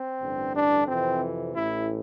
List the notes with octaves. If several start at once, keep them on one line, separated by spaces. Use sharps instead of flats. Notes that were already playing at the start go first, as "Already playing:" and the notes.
Already playing: C4
A1 G2 D3
D4
F2 C3 E3 C4
A1 A2 E3 E4